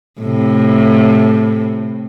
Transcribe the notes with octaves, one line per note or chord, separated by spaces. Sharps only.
A2 C3